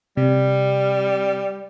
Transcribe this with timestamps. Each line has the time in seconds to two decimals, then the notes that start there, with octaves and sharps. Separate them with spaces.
0.17 C3 G3